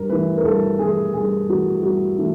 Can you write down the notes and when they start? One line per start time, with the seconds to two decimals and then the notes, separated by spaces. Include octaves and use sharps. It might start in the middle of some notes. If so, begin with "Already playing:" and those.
Already playing: G2 A#4
0.09 E3 A3 B4
0.38 A#4
0.44 G2 A4
0.79 E3 A3 G#4
1.13 G2 G#4
1.49 E3 A3 F#4
1.83 G2 F#4
2.18 E3 A3